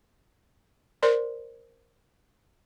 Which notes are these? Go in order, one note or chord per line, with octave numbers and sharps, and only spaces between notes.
A#4 C5 D5 C6